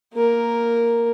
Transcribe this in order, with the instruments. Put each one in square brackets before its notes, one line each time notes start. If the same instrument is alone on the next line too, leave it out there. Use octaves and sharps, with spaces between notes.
[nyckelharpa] A#3 A#4